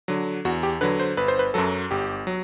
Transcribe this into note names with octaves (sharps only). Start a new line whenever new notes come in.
D3 F#3
E2 F#4
G4
D3 F#3 B4
C5
G1 B4
C5
B4
F#2 F#3 A4
G1 G4
F#3